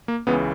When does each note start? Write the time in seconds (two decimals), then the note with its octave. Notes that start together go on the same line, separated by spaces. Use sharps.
0.08 A#3
0.27 C#2 C#3 E3 B3